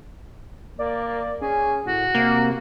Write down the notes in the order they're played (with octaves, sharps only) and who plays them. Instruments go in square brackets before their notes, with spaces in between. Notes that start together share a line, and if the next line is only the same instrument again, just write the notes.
[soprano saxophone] A#3 [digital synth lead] D5
[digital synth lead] C#4 [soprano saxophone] G#4
[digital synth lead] A2 [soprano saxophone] F#4
[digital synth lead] C3 [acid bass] A#3